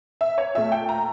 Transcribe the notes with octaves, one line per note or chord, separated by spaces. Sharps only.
E5
C#5
A#2 A3 E5
G5
A#5